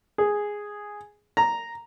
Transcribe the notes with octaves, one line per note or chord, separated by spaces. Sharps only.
G#4
A#5